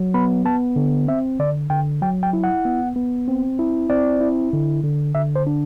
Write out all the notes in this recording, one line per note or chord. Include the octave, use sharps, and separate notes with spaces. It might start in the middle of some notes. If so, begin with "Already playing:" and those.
Already playing: F#3
B3 B5
B3 A5
D3
C4 E5
D3 D5
D3 G5
F#3 G5
G5
E4
F#5
B3
B3
C4
E4
C4 D5
E4
D3
D3
D3 E5
C5
D4